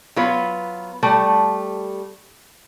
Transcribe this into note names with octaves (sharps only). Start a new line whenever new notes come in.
F#3 B3 F4 B4
G3 A3